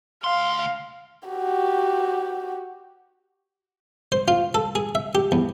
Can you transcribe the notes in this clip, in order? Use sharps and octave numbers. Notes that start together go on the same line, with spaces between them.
D2 F5 C6
F#4 G4
C5
F4
A4
G#4
E5
G4
E2